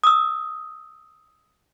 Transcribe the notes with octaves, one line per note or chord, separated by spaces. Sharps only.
D#6 E6